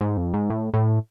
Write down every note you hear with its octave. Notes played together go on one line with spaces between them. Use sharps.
G#2
F2
G#2
A2
A2